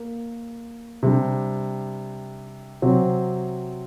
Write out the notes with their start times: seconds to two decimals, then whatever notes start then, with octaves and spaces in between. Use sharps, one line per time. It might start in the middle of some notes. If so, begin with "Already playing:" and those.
Already playing: A#3
1.03 C3 G3 D4
2.82 C3 F#3 C4